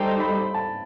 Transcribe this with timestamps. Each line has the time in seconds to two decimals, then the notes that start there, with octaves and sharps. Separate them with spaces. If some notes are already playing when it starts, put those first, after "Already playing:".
Already playing: G3 D#4 A4 C5 G5
0.20 B5
0.54 A5